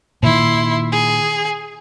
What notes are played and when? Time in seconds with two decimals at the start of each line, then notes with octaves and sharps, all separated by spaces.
0.23 A#2 D#3 E4 C6
0.92 G#4